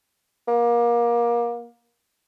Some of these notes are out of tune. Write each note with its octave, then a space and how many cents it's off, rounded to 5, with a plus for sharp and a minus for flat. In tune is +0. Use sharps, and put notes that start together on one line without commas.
A#3 +25